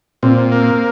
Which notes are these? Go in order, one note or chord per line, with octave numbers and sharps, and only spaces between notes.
A#2 C4
A#3